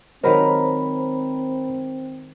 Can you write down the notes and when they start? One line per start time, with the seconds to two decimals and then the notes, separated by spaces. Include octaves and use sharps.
0.24 D#3 F#3 G#3 C4 A#4 C5 A#5 B5